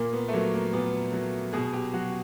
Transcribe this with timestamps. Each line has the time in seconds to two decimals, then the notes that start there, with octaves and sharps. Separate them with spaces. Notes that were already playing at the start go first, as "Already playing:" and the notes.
Already playing: A#2 A#3
0.13 B3
0.28 A3
0.33 F#3 A#3
0.53 A#3
0.73 A#2 B3
1.13 F#3
1.53 B2 G#4
1.73 G4
1.93 F#3 F#4